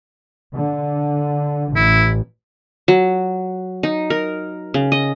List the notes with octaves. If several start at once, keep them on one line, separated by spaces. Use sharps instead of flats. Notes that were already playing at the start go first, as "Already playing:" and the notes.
D3
A1 E4
F#3
D#4
A#4
C#3
D#5